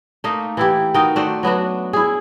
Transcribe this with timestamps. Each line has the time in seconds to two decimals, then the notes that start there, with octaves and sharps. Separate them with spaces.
0.24 A3 A#3 D#4
0.57 E3 E4 G4
0.94 D#3 D#4 F#4 G5
1.16 A3 F#4 C5 D5
1.43 F#3 B3 D4 F#4
1.93 E4 G#4